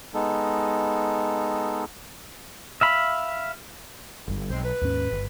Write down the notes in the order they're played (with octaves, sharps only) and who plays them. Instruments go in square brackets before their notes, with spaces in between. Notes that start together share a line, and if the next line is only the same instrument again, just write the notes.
[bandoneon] G#3 B3 D#4 A4
[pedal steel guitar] E5 F5 B5
[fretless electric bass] G1 G2
[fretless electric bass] B1 [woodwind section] G#3 C4 C5
[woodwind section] B4
[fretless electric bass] D#2 G#2 C#4
G1